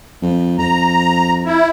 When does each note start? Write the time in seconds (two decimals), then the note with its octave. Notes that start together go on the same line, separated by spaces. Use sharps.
0.22 F2
0.58 F2 A#5
1.45 E4